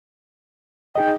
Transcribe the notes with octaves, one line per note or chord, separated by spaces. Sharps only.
D#4 G#4 D#5 G5